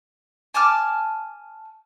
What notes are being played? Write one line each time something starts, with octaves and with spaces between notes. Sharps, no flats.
G#5 A5 D6 F6